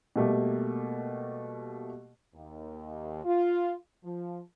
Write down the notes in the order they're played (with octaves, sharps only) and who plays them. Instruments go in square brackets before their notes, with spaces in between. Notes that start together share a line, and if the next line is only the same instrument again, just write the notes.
[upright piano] B2 G3 A3 A#3 G4
[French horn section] D#2
F4
F3